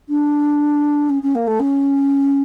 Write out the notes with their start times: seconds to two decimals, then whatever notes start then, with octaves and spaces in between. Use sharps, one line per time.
0.09 D4
1.10 C#4
1.23 C#4
1.35 A#3
1.47 A3
1.60 C#4